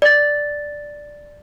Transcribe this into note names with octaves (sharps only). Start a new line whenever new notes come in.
D5 A6